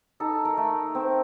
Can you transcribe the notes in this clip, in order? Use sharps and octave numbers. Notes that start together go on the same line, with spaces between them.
D#4 A4
A#4
A3
C4